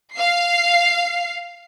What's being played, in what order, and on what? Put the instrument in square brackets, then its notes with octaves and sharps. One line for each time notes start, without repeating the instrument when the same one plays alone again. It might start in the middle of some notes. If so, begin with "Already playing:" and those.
[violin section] F5 C7